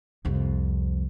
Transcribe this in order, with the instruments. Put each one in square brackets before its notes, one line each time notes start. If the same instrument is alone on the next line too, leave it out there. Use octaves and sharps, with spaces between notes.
[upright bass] C2 F2